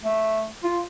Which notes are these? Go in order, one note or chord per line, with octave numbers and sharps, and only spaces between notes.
A3
F4